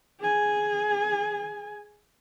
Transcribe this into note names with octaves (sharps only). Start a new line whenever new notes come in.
G#4 G#5